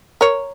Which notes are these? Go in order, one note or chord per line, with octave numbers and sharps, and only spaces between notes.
A#4 C#5